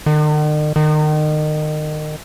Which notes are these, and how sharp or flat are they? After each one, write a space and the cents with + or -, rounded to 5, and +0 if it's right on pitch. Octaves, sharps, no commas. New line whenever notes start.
D#3 -45
D#3 -30